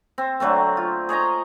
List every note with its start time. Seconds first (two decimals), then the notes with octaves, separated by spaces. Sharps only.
0.18 C4
0.40 D3 F#3 A3 C4
0.77 F4
1.09 G#4 C#5 D#5 A#5